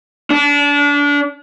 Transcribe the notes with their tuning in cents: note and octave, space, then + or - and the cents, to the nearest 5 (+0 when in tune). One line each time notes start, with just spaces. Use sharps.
D4 -30